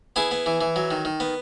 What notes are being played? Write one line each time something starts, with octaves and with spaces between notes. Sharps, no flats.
B3 E4 G#4
B3
E3
E3
F#3
D#3
D#3
B3